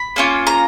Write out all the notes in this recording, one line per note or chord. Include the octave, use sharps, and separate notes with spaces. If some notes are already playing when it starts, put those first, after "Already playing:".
Already playing: B5
A#3 C#4 F4
A#5